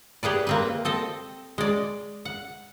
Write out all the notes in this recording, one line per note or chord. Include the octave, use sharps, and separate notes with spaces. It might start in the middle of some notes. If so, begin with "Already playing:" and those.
G4 G#4 B4 D5
A#3 C4 B4
C4 A4 D#5
G#3 D5
F#5